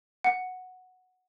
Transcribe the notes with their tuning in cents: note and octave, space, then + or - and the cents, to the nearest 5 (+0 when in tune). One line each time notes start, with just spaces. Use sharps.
F#5 -5